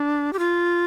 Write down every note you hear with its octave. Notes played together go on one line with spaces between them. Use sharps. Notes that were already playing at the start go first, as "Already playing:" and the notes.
Already playing: D4
G4
F4